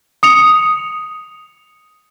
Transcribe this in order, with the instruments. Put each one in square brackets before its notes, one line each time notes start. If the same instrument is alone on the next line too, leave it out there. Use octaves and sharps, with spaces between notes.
[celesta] D#6 C#7 F7